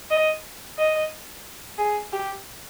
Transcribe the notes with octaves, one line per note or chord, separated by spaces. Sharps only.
D#5
D#5
G#4
G4